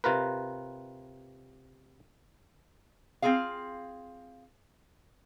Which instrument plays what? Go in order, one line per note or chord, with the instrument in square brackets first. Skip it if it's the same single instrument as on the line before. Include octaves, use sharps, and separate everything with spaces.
[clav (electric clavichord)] C3 F4 A#4 B4
[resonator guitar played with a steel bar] C4 E4 F4 G#4 F5